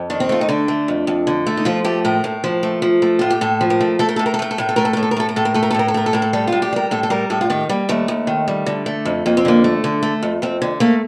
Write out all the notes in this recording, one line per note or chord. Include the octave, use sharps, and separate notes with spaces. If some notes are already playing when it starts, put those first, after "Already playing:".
Already playing: F2
D#3 D4
C4
A3 F4
D#4
D3 D4
A3
F2
F2
D3
A3
D#4
F3 F4
A3 G4
A2 A#4
A2
F3
A3
F3
A3
A2 F4
G4
A2 A4
F3
A#4
A3
A3 A4
A#4
A2 A4
A#4
A4
A3 A#4
A4
A2 A#4
A4
A3 A#4
A4
A2 A#4
A4
A#4
A3 A4
A#4
A2 A4
A#4
A3 A4
A#4
A4
A2 A#4
A4
A3 A#4
A4
A2 A#4
A4
G3 A4
F4
A2
G4
G3 A#4
A2 A4
A4
G3 A#4
A2 A4
F4
D#3 G4
G3 A#3
D#2 A3
D#2
D#3
G3
D3
A3
F2
F2 A#3
C4
D3 A#3
A3
D3
A3
F2
F2 C4
D3
A3 A#3